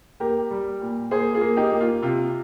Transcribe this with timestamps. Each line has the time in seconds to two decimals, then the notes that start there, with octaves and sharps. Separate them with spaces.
0.20 A#3 G4 A#4
0.51 G3
0.81 A#2
1.11 A#3 G#4 C5
1.34 F4 G#4
1.41 A#3
1.57 D#4 G4
1.72 A#3
1.81 F4
2.02 C3 F4